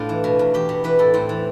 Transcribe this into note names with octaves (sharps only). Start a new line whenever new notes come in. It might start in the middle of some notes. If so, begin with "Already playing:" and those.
Already playing: A2 D4 F4
E3
B2
E2
E2 G4
B2
E3 B4
A2 A4
A2 C4
E3